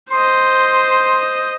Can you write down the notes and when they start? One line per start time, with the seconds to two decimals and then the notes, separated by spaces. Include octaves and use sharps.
0.11 C5 D#5 C6